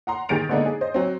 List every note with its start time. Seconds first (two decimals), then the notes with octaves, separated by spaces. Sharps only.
0.07 F#5 A#5 C6
0.29 D#3 G4 G#4 A6 D7 F7
0.49 D3 G#3 A#3 B3 D4 D#4
0.66 G#4
0.81 C5 D#5
0.94 F#3 C4